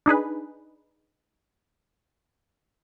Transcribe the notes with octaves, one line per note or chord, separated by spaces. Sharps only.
D4 D#4 G#4 B4